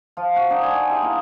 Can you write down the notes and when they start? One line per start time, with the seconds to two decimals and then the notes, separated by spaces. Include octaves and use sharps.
0.17 F3 F4
0.36 F#4
0.50 D4 D#4 F#4
0.63 G#5 C6
0.89 E4 G4 G#4
1.02 A#3 D#5